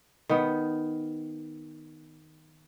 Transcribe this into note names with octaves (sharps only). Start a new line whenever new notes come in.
D#3 B3